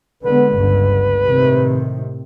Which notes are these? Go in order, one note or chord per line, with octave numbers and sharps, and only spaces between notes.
D3 G#3 B3 B4
G1 C#2 D3
A2 C3 D#3